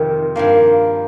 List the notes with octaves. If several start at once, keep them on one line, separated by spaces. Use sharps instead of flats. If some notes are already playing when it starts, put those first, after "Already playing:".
Already playing: F2 C3 D#3 C4 G4
G2 F3 A#3